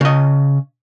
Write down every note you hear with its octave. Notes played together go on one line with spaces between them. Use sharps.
C#3 D#5